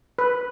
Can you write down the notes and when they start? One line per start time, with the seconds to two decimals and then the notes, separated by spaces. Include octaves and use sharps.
0.18 B4